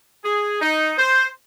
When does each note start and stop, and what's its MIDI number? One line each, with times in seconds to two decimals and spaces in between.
0.25 0.57 68
0.61 0.93 63
0.98 1.27 72